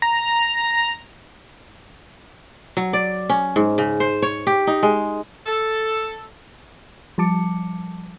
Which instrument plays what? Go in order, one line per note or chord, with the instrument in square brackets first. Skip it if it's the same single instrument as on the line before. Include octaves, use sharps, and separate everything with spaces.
[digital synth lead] A#5
[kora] F#3
D5
C#4
G#2
C#3
C5
C#5
G4
D#4
G#3
[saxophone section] A4
[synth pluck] F3 G3 A5 D6 C#7